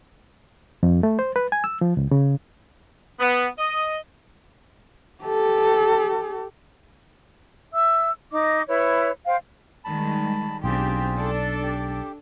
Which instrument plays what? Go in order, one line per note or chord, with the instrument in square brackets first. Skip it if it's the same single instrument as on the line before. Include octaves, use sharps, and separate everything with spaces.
[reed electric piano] F2
A3
C5
B4
G#5
E6
F3
C#2
C#3
[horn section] B3
D#5
[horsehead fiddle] G4 A4
[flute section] E5 E6
D#4 D#5 D6
E4 B4 C#5
C5 F5 G5
[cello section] D#3 G3 G#3 [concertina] A5 B5
[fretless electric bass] B1 [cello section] C4 D4 G4 [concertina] F4 G#4 G5
[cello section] D4 A4 D5
[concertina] G4